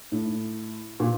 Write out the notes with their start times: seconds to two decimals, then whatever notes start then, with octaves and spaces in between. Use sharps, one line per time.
0.12 A2
1.00 A#2